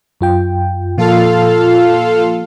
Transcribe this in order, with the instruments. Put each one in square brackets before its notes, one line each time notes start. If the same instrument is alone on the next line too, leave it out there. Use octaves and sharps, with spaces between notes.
[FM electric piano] F#2 F4 G5
[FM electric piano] A#2 F3 A#3 [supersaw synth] F4 A4 F5